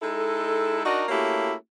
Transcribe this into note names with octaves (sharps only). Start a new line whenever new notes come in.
G#3 D#4 E4 A4
D4 D#4 F#4 A#4 D5 D#5
A3 A#3 C#4 E4 F#4 G4